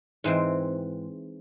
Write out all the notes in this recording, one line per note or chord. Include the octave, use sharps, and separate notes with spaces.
G#2 E3 C4